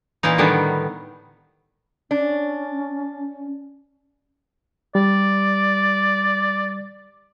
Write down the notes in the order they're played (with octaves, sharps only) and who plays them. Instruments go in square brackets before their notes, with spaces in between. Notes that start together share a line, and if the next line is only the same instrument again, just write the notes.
[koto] A#2 E3 A#3 D#4
A2 D3 D#3 G3 B3
[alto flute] C#4 [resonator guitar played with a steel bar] D4
[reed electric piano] G3 [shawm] D5